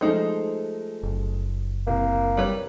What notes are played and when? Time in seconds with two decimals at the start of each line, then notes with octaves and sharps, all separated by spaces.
0.01 F3 G#3 A3 D#4 C5
1.03 F#1
1.87 C2 A#3
2.37 G3 B4 C#5